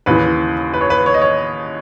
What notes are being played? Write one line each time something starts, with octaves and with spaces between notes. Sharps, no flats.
D#2 C#3 E3 B4
B4
C#5
B4
C#5
D#5
C#5